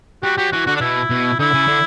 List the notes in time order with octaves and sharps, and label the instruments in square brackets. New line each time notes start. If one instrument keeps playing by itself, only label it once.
[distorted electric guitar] G3 [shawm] F#4
[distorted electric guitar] F#3 [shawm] G4
[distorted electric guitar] E3 [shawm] F#4
[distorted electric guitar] D3 [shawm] F#4
[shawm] D4
[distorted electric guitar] B2 [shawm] E4
[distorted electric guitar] B2
[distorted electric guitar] D3 [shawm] E4
[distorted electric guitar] C#3
D3